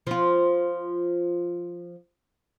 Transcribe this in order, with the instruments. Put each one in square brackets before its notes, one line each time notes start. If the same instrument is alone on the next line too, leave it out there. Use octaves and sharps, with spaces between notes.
[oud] F3 F4